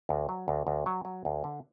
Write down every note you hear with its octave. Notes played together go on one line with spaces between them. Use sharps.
D2
F#3
D2
D2
F#3
F#3
D2
D3